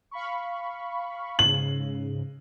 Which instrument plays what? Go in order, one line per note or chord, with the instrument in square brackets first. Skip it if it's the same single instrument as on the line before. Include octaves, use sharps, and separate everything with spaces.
[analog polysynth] F5 B5 C#6
[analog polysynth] G#2 C#3 [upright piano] F#7